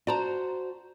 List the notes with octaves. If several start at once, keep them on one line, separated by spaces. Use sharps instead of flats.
F#4 C5 D5 A5 A#5